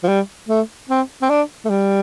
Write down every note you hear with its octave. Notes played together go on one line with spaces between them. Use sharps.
F3
G3
A3
C4
C4
D4
A3
G3